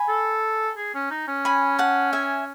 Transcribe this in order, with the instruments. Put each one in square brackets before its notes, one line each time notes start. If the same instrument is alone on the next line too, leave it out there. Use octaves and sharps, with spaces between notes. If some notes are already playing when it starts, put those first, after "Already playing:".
Already playing: [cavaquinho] G#5 B5
[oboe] A4
G#4
C#4
D#4
C#4
[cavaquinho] G#5 B5
F#5 A5
E5 G#5